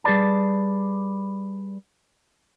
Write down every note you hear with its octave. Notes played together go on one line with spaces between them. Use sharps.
G3 G#4 B4 D5 A5